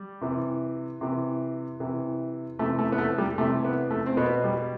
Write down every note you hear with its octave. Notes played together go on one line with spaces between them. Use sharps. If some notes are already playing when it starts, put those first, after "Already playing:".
Already playing: G3
C3 E3
C3 E3
C3 E3
C3 E3 A3
A3
B3
A3
G3
C3 E3 A3
B3
A3
C4
B2 B3
G3